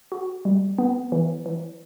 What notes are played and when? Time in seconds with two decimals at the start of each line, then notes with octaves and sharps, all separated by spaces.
0.12 F#4
0.45 G3
0.78 B3
1.12 E3
1.46 E3